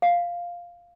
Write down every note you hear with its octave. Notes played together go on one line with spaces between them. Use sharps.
F5